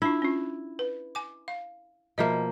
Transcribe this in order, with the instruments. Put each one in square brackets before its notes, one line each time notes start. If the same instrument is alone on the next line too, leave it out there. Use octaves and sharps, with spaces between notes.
[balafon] D4 F4 [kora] E4
[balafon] C#4 F4
B4
G#5 D6
F5
[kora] B2 F3 A#3 [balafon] D#5 E5